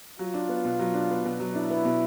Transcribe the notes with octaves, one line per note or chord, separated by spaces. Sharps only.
F#3 F4
D4
B3
B2
F#3
D4
B3
B2
F#3
D4 E4
B3
B2